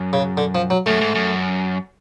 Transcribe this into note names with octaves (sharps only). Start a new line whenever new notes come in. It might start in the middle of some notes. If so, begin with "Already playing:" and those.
Already playing: F#2
C#3
D3
F3
F#3
F#2 A3
G#2
F#2